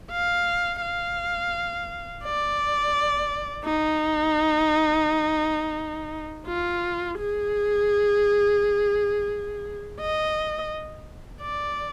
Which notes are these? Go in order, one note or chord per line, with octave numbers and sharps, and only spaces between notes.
F5
F5
D5
D#4
F4
G#4
D#5
D5